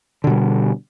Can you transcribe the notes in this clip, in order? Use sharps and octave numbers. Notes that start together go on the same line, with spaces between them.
B2 D3 G3